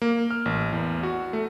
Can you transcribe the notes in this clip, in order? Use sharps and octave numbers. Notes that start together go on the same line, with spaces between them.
A#3
F6
A1
E2
F#4
A3